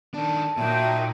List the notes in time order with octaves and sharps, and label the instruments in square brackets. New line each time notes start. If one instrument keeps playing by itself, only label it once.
[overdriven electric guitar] D#3 D4 [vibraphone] A5
[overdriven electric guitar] A#2 [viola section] F#3 A#3 D#4 [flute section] E5 G5